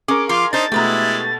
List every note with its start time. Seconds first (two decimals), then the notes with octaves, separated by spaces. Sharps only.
0.08 C#4 G#4 A#4 D6
0.29 F3 F4 F5 C6 D6
0.53 D4 D#4 C5 A6
0.72 B2 G#3 A3 E4 G4 B4 A#5